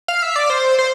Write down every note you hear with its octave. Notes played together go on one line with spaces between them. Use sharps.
F5
E5
D5
C5
C5